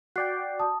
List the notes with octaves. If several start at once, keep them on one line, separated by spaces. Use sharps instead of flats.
F#4 D5 G5 F#6 C7
A5 D#6